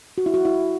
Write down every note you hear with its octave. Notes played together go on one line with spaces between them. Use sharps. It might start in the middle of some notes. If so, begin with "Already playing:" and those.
F#4
E4
F#4
E4